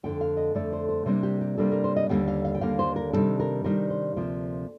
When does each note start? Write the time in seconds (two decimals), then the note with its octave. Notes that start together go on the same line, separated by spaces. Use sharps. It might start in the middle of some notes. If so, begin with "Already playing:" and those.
0.03 F2 D3 A3 G5
0.21 F5
0.37 D#5
0.55 F2 D3 A3 D5
0.73 C5
0.89 C5
1.06 C3 G3 A#3 D4 C5
1.23 G4
1.41 G4
1.58 C3 G3 A#3 D4 A4
1.72 A#4
1.84 C5
1.96 D#5
2.09 D#2 D3 G3 A#3 G5
2.28 F5
2.45 F5
2.55 G5
2.61 D#2 D3 G3 A#3 F5
2.79 C5
2.96 A#4
3.13 C3 D#3 G3 D4 A4
3.40 A#4
3.64 C3 D#3 G3 D4 A#4
3.90 C5
4.16 D2 C3 F3 A#3